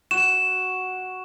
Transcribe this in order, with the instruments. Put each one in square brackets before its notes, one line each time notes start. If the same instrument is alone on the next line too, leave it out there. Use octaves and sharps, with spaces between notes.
[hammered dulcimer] F#4 [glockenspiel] E7